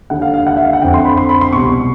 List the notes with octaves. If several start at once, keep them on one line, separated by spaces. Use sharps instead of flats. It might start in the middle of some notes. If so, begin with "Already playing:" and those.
D#2 D3 F#5
F5
F5
F#5
E5
F5
F#5
F2 D3 G5
C6
B5
C6
B5
C6
C2 B2 C#6